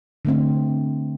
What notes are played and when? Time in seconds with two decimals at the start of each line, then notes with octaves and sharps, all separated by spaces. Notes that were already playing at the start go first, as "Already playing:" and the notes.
0.25 D3 A3 C4